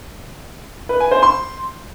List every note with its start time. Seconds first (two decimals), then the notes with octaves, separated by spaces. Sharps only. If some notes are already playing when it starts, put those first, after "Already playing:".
0.89 B4
1.00 G#5
1.11 C5
1.23 C6